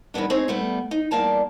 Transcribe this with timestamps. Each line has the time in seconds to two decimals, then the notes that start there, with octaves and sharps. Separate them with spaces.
0.14 E2 D#3 G3 B3 D4
0.30 C4 D#4 G#4 C#5
0.48 G3 A3 B3
0.91 D#4
1.11 E2 G3 A#3 D5 A5 A#5